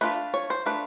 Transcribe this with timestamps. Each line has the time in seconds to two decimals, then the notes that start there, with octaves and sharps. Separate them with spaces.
0.01 A3 D4 F4 B4
0.34 C#5
0.50 C5
0.66 A3 D4 F4 B4